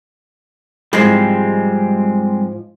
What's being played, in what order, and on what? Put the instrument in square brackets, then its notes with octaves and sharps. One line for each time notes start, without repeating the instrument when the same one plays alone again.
[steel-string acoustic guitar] G#2 F3 [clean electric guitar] G3 G#3 C4